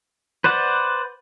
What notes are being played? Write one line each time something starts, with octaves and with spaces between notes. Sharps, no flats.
B4 C5 D5 F#5